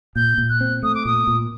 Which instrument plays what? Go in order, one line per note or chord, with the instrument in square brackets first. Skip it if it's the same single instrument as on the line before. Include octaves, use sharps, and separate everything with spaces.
[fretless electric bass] A#2 [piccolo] G6
[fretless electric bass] A#2
[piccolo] F#6
[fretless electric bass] C4
[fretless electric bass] A3 [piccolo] D#6
[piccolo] D6
[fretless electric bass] A#2 [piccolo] D#6
[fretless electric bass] A#2